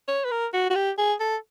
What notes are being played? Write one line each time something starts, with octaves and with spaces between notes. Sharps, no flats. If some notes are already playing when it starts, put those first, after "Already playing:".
C#5
B4
A#4
F#4
F#4
G4
G#4
A4